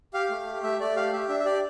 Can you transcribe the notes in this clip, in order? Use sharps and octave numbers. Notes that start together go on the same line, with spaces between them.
G4 F5
A3
G4
A3 E5
A3 D5
G4 F5
G4 E5
D4 E5
E5
G4 D5